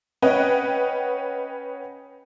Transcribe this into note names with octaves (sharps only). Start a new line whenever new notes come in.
C#4 B4 D#5 F#5 G5